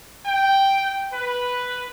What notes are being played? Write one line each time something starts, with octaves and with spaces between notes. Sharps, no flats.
G5
B4